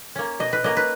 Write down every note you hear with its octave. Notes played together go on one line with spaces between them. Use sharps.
A#3 C#4
B2 D#5
B4
A#3 C#4 D#5
B4